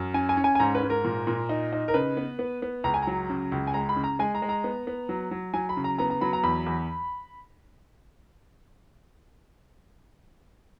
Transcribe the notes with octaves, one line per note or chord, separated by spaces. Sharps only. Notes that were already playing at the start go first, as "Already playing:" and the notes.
Already playing: F#2
C#4 G#5
G#5
C#4
G#5
G#5
G#2 A#5
B4
G#2
A#4
A#2
A#2
D#4
D#4
A#4
C#3 B4
B3
B3
B3
C#2 A#5
G#5
F#3 A#5
C#3
C#2
G#5
G#3 A#5
B5
C#3
A#5
G#3 G#5
A#5
G#3
A#5
B3
B3
F#3
F#3
F#3 G#5
B5
C#3
A#5
B3 A#5
A#5
F#3 B5
A#5
E2 B5
E2